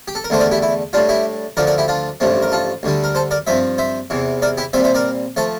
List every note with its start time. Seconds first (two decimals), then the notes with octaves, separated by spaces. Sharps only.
0.08 G4
0.15 A4
0.24 A#4
0.30 E2 D3 A3 D4 C5
0.40 A#4 D5
0.51 E4 G4
0.62 E4
0.93 A2 G3 D4 F4
1.09 E4 G4
1.57 D2 D3 F3 A#4 D5
1.67 A#4 D5
1.78 E4 G4
1.88 D4 F4
2.20 A1 G2 F3 A3 C4
2.42 A#4
2.52 F4 A4
2.83 D2 D3 G3 D4
3.04 A#4
3.15 A4 C5
3.31 A#4 D5
3.47 G2 F3 C4 C5 E5
3.78 C5 E5
4.10 E2 C3 E3
4.42 A#4 D5
4.58 E4 G4
4.73 A#2 G3 C4 C5 E5
4.84 C5 E5
4.95 A#4 D5
5.36 F3 A3 A4 C5